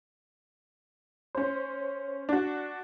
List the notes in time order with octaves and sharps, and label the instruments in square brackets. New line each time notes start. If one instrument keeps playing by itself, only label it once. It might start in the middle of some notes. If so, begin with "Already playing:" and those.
[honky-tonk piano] C#4 C5
D4 F#4